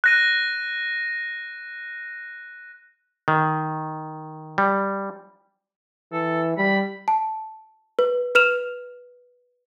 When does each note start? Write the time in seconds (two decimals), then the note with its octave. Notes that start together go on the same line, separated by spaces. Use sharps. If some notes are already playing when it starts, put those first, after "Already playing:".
0.04 F#6 A#6 D#7
3.28 D#3
4.58 G3
6.12 E3 A4
6.58 G3 B5
7.08 A5
7.99 B4
8.35 B4 F6 E7 F7